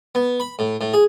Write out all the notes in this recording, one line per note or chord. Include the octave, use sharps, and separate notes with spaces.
B3
B5
A2
A2
G#4